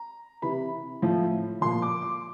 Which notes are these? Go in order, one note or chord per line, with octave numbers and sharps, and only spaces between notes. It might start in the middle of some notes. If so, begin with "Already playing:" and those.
Already playing: A#5
C3 E3 B5
A2 F3
A#2 F3 C6
D6
D6